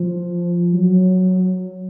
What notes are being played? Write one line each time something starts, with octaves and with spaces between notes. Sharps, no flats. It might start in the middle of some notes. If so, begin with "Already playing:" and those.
Already playing: F3
F#3